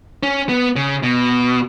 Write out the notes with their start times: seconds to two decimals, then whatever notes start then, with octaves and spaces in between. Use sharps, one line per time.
0.23 C#4
0.49 B3
0.76 C#3
1.03 B2